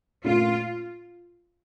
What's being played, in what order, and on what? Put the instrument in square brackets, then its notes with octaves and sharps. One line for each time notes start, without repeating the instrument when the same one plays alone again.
[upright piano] A#2 A3 C#4 [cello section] F4